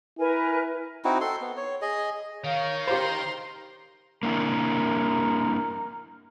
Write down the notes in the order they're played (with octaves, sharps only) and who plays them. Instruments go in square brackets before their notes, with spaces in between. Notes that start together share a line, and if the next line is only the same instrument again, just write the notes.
[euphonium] E4 [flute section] A#4 B4 G#5
[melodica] C4 D#4 E4 F#4
A4 C6
B3
C#5
G#4 D#5
[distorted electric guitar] D#3 [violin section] C#5 [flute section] F5
[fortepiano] G4 C5 [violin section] A#5 C6
[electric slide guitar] A#3 D4 E4 [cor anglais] A#4